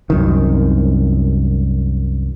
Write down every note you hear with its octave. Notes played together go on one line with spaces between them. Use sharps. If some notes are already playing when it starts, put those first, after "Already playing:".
C2 F#2 D#3